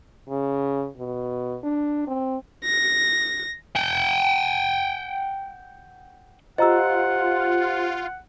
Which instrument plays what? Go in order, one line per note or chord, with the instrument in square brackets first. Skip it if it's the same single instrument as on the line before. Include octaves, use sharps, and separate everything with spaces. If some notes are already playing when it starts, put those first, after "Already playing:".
[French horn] C#3
B2
D4
C4
[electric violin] A#6
[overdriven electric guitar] F#5 G5
[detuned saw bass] F4 [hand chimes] G4 C5 [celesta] D#5 A#5 E6 [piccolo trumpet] F#5